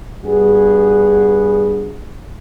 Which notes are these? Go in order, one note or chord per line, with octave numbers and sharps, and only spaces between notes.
G2 B3 F#4 G#4